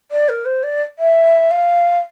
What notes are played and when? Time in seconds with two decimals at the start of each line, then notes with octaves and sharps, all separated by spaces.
0.11 D5
0.29 A#4
0.45 C5
0.63 D5
0.99 E5
1.51 F5